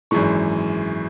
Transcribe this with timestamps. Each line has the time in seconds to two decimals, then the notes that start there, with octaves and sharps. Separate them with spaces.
0.11 G#1 F#2 E3 G#3 C#6